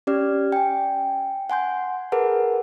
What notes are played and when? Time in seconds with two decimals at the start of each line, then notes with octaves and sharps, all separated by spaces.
0.07 C#4 G4 D5 F6
0.52 G5 G#5
1.50 F#5 G#5 C6 G6
2.12 G#4 A#4 B4 F#5 A5